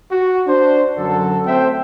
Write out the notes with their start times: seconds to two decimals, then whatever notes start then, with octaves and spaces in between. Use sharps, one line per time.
0.11 F#4
0.47 D4 C5
0.98 F#2 D3 F#3 A4
1.46 A3 C4 A4 C5 E5 G5